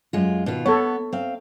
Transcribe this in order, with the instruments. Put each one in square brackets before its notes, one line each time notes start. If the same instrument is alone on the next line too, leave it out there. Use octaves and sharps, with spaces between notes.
[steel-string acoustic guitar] F#2 G#3 F4
B2 D#3 F4
[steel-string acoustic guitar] B3 [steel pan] A4 C#5
[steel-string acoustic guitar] C4 F5